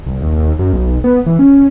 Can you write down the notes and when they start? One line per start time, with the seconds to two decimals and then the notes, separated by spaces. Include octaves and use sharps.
0.07 C2
0.22 D#2
0.59 F#2
0.73 B1
1.04 B3
1.26 E3
1.39 C#4